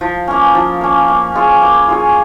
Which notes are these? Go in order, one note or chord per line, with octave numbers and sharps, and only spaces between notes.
F3
A#3 C#4
F3
A#3 C#4
A#3
F4 G#4 C#5
A#3
F4 G#4 C#5